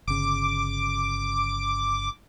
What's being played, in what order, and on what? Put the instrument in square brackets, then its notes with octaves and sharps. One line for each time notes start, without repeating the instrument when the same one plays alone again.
[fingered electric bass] G1 C#3 [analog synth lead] D6